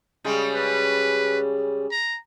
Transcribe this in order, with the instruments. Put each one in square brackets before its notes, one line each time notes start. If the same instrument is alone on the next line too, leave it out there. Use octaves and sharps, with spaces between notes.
[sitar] C#3 G3 G#3
[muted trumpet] B4
A#5